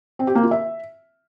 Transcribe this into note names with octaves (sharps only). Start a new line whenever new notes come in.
C4
G4
A#3
F4
E5